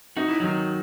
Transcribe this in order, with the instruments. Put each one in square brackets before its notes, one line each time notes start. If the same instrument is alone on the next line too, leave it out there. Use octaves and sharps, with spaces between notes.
[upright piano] D#4 [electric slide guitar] F#4
[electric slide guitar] E4
[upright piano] D#3 [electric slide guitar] F#3 F#4